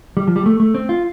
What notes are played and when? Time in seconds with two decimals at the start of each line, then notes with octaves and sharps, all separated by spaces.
0.17 G3
0.27 F3
0.36 G3
0.46 A3
0.60 A3
0.75 C4
0.89 F4